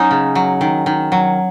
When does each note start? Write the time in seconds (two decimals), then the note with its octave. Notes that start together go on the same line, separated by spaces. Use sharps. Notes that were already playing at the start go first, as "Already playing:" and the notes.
Already playing: F#3 C#4 D#4
0.11 C#3
0.35 F#3
0.61 D#3
0.86 D#3
1.12 F#3